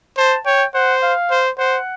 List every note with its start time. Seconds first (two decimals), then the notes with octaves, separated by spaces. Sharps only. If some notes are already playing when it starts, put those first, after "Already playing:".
0.17 C5 A5
0.45 C#5 G5
0.74 C5 F#5
1.03 F5
1.30 C5
1.58 C5 F#5